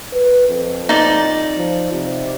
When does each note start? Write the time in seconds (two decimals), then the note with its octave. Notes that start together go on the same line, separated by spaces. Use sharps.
0.13 B4
0.49 F2
0.89 D#4 D5
1.57 F3
1.93 C3